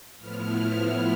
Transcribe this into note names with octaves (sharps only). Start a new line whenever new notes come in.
A2 F3 B3 E4 F6